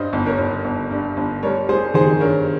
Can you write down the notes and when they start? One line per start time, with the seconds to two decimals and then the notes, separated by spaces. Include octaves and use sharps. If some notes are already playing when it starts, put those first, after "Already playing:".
Already playing: G2 C5 D#5
0.13 G1
0.26 A#4 C#5
0.38 G1
0.65 G1
0.90 G2
1.17 G1
1.43 G3 A#4 C#5
1.69 G3 G#4 C5
1.94 D#3 G#4 C5
2.20 G2 A#4 C#5